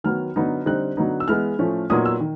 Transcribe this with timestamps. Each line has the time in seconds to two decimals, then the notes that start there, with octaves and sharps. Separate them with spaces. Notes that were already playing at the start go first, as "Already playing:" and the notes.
0.04 D#3 F#3 B3 F6
0.36 D3 F#3 B3 D#4
0.66 D3 G3 C4 D#4 F#6
0.97 D3 F#3 B3 D#4
1.20 E6
1.28 E3 G#3 B3 F6
1.59 A2 F3 A3 C#4
1.90 A#2 F#3 B3 D#4 D#6
2.06 E6
2.20 D#3